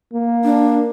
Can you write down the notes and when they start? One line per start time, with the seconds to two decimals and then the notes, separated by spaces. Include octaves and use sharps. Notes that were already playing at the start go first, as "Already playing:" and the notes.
0.13 A#3
0.44 D4